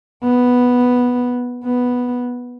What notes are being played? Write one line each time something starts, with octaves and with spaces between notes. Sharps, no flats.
B3
B3